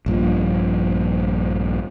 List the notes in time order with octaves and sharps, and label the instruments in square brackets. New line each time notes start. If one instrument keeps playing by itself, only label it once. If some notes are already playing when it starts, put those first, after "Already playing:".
[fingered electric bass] A#1 G2 A#2 F3